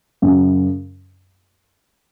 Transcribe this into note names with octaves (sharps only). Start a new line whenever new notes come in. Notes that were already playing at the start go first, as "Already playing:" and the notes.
F#2 C#3